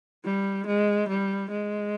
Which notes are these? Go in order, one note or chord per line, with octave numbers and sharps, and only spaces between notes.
G3
G#3
G3
G#3